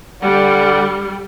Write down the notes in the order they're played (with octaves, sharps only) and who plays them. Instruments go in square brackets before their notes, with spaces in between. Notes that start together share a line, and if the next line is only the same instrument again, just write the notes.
[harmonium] D3 D5 F#5 [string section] G3